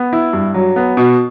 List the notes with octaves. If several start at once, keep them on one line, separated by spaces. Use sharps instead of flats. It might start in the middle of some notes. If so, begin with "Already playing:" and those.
Already playing: B3
E4
G2
F#3
B3
B2